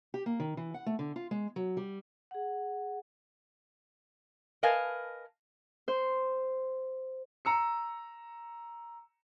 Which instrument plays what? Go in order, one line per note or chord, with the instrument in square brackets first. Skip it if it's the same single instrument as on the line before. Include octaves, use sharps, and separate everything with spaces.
[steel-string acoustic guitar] G4
A#3
D#3
E3
F#5
A3
D3
F4
G#3
F#3
G3
[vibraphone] G#4 F#5
[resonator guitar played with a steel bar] A#4 B4 D#5 F5 G#5 A5
[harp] C5
[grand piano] A#5 E6 C#7